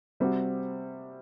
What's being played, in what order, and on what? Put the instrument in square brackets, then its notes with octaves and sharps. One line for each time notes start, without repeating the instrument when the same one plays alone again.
[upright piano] C3 G3 C4 F#4